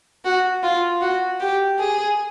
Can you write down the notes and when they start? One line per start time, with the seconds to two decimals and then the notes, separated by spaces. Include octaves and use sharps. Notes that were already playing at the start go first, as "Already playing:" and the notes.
0.25 F#4
0.63 F4
1.01 F#4
1.40 G4
1.79 G#4